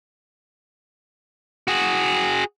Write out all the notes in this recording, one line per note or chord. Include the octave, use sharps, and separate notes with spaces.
F#4 G#4